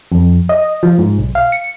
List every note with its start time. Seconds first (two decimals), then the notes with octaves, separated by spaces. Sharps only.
0.12 F2
0.49 D#5
0.83 F3
0.99 G#2
1.18 B1
1.35 F5
1.52 C#7